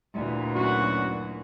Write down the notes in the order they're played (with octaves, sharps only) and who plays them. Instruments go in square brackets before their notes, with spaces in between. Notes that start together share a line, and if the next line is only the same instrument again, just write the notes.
[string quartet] D2 A#2 E3
[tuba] F#2 [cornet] F#4